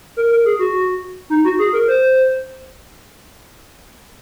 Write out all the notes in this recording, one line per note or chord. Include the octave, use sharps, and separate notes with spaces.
A#4
A#4
G#4
F#4
D#4
F#4
G#4
A#4
C5